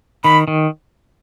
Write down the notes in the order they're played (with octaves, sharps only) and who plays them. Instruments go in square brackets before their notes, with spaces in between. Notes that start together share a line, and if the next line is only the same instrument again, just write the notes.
[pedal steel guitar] D#3 [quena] B5
[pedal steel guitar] D#3